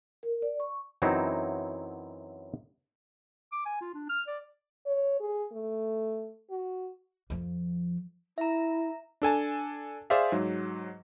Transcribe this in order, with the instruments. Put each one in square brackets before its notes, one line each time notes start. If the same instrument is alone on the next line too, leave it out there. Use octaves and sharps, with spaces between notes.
[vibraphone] A#4
D5
C#6
[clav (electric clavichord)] F#2 E3 F#3 C4 D#4 E4
[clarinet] D6
G#5
F4
D4
F6
D5
[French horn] C#5
G#4
A3
F#4
[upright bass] F2 F3
[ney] E4 [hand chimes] E5 A#5
[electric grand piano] D4 A4 G#5 A5
G#4 C5 D5 E5 F5
G#2 F#3